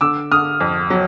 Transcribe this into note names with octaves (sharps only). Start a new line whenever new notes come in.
D3 D6 E6
D3 D#6 F6
F2
F#3